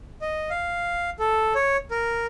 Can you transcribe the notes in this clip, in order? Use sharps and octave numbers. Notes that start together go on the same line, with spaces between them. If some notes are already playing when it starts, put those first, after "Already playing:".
D#5
F5
A4
C#5
A#4